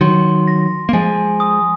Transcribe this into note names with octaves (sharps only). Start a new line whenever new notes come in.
D#3 F#3 C6
A#6
A#3
F3 G#3 G#5
D#6